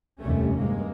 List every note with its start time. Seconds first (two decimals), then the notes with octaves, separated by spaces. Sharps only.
0.21 F1 D#2 C3 G3 A3 C#4
0.56 G2 C3 G#3 A#3